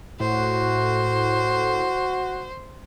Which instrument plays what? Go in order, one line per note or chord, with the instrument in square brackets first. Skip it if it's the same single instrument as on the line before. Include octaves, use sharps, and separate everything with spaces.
[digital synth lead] A2 [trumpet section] F#4 [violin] C5